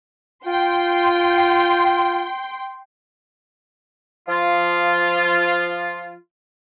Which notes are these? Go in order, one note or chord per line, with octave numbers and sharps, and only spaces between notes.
F4 G5 C6
F3 F4